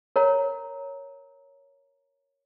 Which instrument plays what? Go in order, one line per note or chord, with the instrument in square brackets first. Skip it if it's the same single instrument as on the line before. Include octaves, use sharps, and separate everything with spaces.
[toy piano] A#4 C#5 A#5